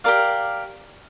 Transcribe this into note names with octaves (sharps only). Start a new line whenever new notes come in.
G4 A#4 D5 F5